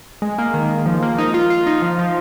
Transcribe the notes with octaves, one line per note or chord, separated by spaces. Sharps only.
G#3
A#3
D#3
D#3
F3
A#3
D#4
F4
F4
D#4
F3
F3